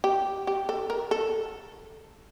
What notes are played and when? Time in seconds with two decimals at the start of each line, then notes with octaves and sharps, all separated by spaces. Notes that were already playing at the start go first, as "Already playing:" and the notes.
0.04 G4
0.47 G4
0.69 A4
0.90 A#4
1.11 A4